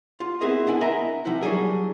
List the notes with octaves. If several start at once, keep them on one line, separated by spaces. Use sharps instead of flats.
F4
B3 C4 E4 G#4 A#4 D#5
B3 D4 E4 G#5
A#4 D#5 E5 G#5 A#5 B5
C3 F3 D#4 E4 F#5
F#3 G3 D4 G#4 A#4